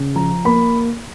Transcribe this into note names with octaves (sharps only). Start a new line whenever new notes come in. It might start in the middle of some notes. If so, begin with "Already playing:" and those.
Already playing: C#3
F3 A#5
A#3 B5